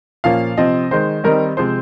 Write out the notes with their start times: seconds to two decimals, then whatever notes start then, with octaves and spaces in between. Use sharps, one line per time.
0.24 A#2 F3 A#3 C#4 F5
0.57 C3 F3 C4 D#5
0.91 D#3 G#3 D#4 C5
1.24 D#3 G3 C4 D#4 A#4
1.57 C3 F3 G#3 C4 C5